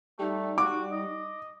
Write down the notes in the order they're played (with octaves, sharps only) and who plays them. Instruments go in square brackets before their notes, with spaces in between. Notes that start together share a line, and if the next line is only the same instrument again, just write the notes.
[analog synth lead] G3 [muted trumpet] A3 [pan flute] D#4
[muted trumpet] F#4 [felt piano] D6
[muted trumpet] D#5